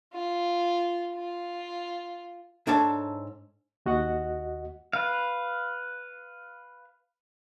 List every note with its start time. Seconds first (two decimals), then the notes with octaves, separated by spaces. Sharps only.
0.14 F4
1.16 F4
2.67 G#2 D4 A4 C#5 A5
3.86 D#2 F#4 D#5 F#5
4.93 B4 F5